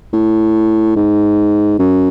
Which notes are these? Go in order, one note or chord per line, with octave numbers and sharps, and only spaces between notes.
A2
G#2
F#2